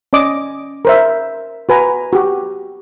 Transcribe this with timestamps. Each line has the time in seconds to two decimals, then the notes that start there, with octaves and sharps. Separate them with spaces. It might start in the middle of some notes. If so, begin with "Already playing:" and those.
0.13 C#4 D5 D#5 D6 D#6
0.85 A#4 C5 E5
1.69 F#4 B4 G#5 A#5
2.13 F#4 G4